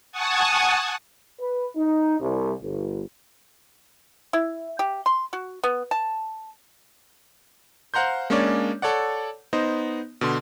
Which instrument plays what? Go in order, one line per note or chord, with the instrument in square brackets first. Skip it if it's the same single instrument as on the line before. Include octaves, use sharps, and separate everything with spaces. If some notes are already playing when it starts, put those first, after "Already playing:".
[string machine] F#5 G#5 A5 C#6 D#6
[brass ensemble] B4
D#4
C2
G1
[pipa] E4
G4
C6
F#4
B3
A5
[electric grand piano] C5 F5 F#5 A#5 C6 G6
G#3 A#3 C#4 D4 C#5 D5
A4 C#5 D5 F#5
B3 D#4 C5 D#5
B2 D3 C6